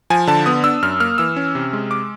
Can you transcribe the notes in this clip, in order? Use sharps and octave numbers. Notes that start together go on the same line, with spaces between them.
F3 G#5
D3 A5
B3 D#6
D4 E6
F#2 F6
A#3 F6
E3 E6
C#4
C3
G#3
D6